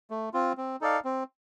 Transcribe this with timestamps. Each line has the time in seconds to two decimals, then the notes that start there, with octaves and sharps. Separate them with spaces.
0.10 A3
0.33 C4 F4
0.57 C4
0.81 D#4 A4 D5 F5
1.05 C4